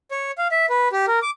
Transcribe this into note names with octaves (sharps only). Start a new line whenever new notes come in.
C#5
F5
E5
B4
G4
A#4
D6